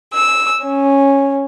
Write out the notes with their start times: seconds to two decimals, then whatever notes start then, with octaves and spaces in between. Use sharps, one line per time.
0.14 E6
0.64 C#4